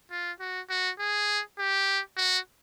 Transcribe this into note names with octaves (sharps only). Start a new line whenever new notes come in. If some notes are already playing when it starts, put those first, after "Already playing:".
F4
F#4
F#4
G#4
G4
F#4